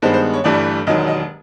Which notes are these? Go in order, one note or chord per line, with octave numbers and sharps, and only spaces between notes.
G2 D#3 G#3 B3 C5
C5
C#5
G1 G2 E3 A3 D5
E1 D#2 D#3 F#3 D#5
D#5